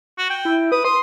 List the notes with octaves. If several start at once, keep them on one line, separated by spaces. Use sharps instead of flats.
F#4
G5
E4
B4 D#6
C6 D#6